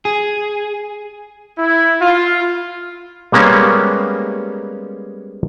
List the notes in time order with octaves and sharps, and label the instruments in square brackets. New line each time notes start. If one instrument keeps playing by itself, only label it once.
[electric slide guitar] G#4
[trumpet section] E4
F4
[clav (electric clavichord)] G3 G#3 A#3 B3 C#4